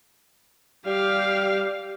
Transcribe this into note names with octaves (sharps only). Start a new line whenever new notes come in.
G3 G4 F5